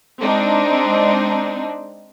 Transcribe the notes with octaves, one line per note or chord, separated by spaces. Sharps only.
G#3 C4 D4 D#4